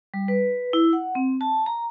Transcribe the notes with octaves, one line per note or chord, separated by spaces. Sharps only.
G3
B4
E4
F#5
C4
A5
A#5